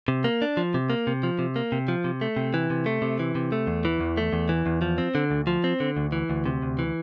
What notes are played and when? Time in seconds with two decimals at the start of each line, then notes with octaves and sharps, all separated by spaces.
0.08 C3
0.24 A#3
0.42 D4
0.57 F3
0.74 C3
0.90 A#3
1.07 C3
1.23 F3
1.39 C3
1.56 A#3
1.72 C3
1.88 F3
2.04 C3
2.21 A3
2.37 C3
2.54 E3
2.70 C3
2.86 A3
3.02 C3
3.19 E3
3.35 C3
3.52 A3
3.67 E2
3.85 E3
4.00 E2
4.17 A3
4.33 E2
4.49 E3
4.66 E2
4.82 F3
4.98 C4
5.15 D3
5.31 D2
5.47 F3
5.64 C4
5.80 D3
5.97 D2
6.12 E3
6.30 D2
6.46 C3
6.62 D2
6.79 E3